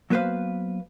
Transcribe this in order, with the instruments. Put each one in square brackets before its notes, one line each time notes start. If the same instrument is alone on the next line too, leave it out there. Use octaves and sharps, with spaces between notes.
[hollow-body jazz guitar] F#3 A#3 B3 B4 C5 F5